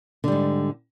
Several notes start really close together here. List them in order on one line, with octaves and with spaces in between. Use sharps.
D3 G3 G#2